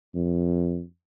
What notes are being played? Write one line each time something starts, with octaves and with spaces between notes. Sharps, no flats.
F2